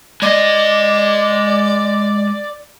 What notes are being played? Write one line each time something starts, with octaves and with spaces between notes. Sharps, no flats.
G#3 D5 D#5